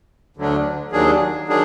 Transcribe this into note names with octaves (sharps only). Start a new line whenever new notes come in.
D2 D3 F#3 D4
D#2 D#3 F#3 D4 G#4
D#3 F#3 D4 G#4